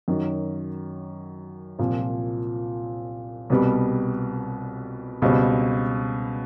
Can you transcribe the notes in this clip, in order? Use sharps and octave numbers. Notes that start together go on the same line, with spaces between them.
F#2 D#3 F#3
C2 A#2 F3
C2 B2 G3 B3
C#2 B2 G3 C4